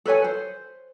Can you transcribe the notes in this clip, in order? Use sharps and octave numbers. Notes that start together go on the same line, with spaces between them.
A4 B4 C#5 G#5
C5